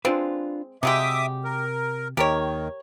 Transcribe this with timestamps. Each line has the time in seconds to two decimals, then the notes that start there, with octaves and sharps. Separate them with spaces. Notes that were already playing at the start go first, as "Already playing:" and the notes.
0.05 G#3 C4 D4 F4 B4
0.83 C3 F#3 G#3 G4 E5 D6 D#6
1.44 A#4
2.17 D#2 D#3 G4 A#4 C#5